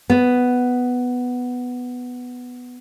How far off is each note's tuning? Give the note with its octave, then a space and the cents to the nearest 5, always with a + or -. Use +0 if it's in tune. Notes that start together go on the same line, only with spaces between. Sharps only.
B3 +5